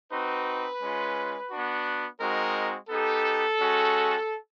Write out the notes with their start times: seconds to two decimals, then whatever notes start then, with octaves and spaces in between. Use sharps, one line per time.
0.11 C4 D#4 F#4 B4
0.80 G#3 C#4 F4
1.51 B3 D4 F#4
2.20 G#3 C4 D#4 F#4 A#4
2.90 B3 D#4 G4 A4
3.60 G#3 C#4 F#4